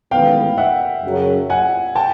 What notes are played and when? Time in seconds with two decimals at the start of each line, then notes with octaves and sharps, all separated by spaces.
0.11 A1 G#2 D#3 F#3 B3 F5 G5
0.58 E5 F#5
1.04 F#2 C#3 F#3
1.50 F#5 G#5
1.95 G5 A5